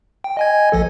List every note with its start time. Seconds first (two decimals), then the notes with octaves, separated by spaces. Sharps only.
0.24 G5
0.37 D#5 G#5 G#6
0.72 A#1 F3 A4